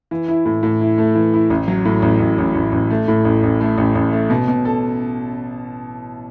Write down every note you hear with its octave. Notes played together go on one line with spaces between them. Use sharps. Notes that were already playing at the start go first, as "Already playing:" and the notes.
E3
E4
A2
A2
E4
A3
E3
E4
A1
F#3
A2
A1
A1
A1
A1
A1
A3
A2
A1
A1
A3
A1
A1
A3
B2
B2
A4